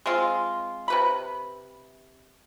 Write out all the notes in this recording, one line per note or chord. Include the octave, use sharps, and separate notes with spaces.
G#3 C4 F4
C3 B4 B5